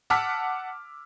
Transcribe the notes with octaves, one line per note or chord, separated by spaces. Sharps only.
F#5 A5 D6 E6 F6 B6